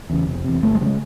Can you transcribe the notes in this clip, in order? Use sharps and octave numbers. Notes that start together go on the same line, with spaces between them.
E2 C#3
F1
E2 C3
G1 A3
G#3
C#3 G3
G#3